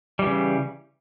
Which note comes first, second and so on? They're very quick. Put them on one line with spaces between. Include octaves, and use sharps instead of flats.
G3 E3 C#3